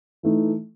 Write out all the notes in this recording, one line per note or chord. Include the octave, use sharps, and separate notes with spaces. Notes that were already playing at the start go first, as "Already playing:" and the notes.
E3 A3 D#4